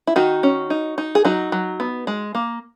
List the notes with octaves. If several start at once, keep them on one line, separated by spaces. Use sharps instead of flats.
E4
D#3 D#4 F#4
C#4
D#4
D#4
G#4
F#3 D#4 F#4
F#3
B3
G#3
A#3